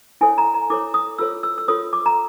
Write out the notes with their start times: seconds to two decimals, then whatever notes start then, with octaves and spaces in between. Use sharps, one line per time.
0.21 E4 A4 C#5 G#5
0.38 A#5
0.54 A#5
0.70 E4 A4 C#5 D6
0.94 D#6
1.18 F4 A4 C#5 E6
1.43 E6
1.58 E6
1.68 F4 A4 C#5 D#6
1.93 D6
2.06 A#5